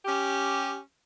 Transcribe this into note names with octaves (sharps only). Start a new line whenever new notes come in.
C#4 G4